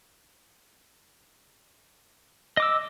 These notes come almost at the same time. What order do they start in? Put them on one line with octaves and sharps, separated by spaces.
D#5 D6 E6